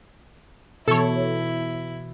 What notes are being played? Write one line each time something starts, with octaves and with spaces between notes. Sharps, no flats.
B2 E3 E4 A4 C#5